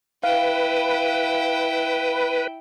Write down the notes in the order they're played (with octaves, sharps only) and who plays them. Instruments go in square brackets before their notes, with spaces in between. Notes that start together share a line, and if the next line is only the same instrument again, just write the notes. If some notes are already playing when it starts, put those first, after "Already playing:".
[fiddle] E4 G5 [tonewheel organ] B4 [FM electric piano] F5